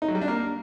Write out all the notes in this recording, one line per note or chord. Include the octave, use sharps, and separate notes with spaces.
D#4
F#3
G3
D4
A#3